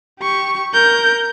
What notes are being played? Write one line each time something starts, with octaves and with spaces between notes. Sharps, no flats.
G4 C#6
A#4 G6